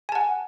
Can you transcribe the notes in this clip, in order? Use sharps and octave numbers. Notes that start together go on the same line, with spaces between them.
F#5 G#5 A5